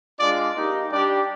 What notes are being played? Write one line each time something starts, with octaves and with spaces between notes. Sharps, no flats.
G#3 D4 F4 D5
A#3 D#4 G4
G3 D4 G4 D5